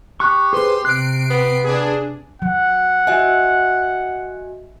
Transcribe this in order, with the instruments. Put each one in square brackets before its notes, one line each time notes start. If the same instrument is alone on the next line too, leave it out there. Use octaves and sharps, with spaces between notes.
[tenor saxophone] G4 [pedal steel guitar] C#6 F#6
[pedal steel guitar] G#4 B4 C5 [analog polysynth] C6
[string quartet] C3 [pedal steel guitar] F#6 [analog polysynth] C7 D7
[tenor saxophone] B3
[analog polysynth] D4 G#4
[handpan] F#3 [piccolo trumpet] F#5
[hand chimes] F#4 D#5 G#5 [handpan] E5